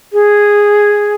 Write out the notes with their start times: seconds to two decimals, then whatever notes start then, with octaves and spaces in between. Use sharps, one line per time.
0.13 G#4